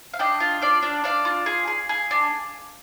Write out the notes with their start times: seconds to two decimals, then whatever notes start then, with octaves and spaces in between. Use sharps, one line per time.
0.14 F5
0.19 D4 D#5 G5
0.40 F4
0.62 D4 D5 F5
0.83 D4
1.04 D4 D5 F5
1.25 F4
1.46 G#4
1.68 G#4
1.89 G#4
2.11 D4